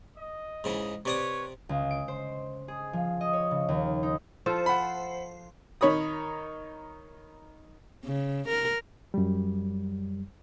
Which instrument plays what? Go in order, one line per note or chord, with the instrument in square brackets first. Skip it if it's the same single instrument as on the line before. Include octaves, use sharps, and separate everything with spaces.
[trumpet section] D#5
[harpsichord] G#2 C#3 E3
[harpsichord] C3 D5 D#6 [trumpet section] B4 C#5
[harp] C#2
D7
C5
G#4
F3
D#5
C#5
C#3
D#2
D#4
[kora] F3 F4 A4 [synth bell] C5
[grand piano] F#5 B5
[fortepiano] D#3 D#4 C#5 B5 D#6
[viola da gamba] C#3
A#4
[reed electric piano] F#2 G3